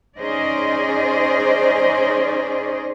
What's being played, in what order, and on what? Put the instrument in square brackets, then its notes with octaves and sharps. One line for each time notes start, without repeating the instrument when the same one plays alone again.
[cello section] C#4 D#4 G#4 C5 D5 D#5